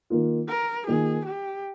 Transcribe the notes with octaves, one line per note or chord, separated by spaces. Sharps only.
D#3 A#3 F4
A#4
D#3 A#3 F4 G#4
G4